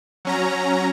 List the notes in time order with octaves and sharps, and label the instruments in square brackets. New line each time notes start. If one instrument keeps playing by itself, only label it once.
[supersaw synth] F#3 C#4 A#5